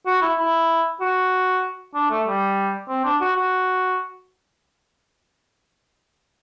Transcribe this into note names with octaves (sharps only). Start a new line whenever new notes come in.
F#4
E4
E4
F#4
D4
A3
G3
C4
D4
F#4
F#4